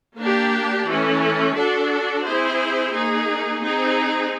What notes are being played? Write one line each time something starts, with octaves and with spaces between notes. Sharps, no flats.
A#3 D4 G4
E3 A3 C#4
D4 F#4 A4
C4 E4 G#4 C5
A#3 D#4 G#4
C4 D#4 G#4